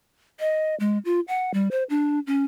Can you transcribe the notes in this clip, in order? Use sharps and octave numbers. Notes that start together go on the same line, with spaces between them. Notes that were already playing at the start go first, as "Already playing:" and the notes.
D#5
G#3
F4
F#5
G3
C5
D4
C#4